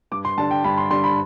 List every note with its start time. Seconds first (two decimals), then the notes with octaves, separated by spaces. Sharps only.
0.11 G2 D6
0.25 C6
0.38 D3 G3 D4 A5
0.51 G5
0.64 G2 B5
0.78 C6
0.90 D3 G3 D4 C6
1.04 B5